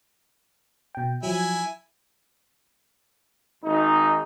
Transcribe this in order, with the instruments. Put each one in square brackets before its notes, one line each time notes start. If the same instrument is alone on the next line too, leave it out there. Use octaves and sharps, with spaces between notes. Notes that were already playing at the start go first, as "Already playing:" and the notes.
[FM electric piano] B2 G5
[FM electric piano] F3 F#3 [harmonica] E4 G#5
[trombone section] G#1 D#4